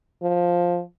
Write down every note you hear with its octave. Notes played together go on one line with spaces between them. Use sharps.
F3